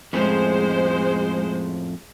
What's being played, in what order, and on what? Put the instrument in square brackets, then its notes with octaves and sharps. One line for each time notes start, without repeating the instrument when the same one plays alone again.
[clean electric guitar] F2 A2 C#4 [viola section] G#3 C5